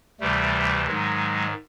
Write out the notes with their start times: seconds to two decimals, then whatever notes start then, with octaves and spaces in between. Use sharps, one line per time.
0.20 D2 C3 E3 G3 A3
0.87 G#2 D#3 F#3 G#3